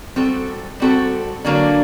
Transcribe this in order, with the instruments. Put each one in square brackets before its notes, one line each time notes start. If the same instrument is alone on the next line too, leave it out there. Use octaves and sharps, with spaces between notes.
[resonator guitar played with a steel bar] G3 C4 F#4 A4
G3 C4 F#4 A4
D3 F#3 A#3 D4